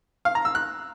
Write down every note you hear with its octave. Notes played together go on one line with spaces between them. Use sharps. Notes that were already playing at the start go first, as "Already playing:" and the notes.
F5
A#5
E6
F#6